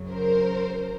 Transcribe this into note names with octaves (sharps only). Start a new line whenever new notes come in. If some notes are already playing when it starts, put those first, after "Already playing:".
Already playing: F#2 C#3 F#3
A#4 C5